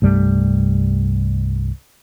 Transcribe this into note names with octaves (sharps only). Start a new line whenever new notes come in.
C2 G2 G3 A3